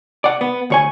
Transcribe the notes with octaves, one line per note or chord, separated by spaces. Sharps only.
D5 F#5
B3
D2 C#5 G#5